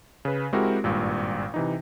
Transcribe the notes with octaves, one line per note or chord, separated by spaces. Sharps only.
C#3 B4
G#3 C4 E4 F#4 G4 A#4
G#1 G2 A#2
C3 E3 D#4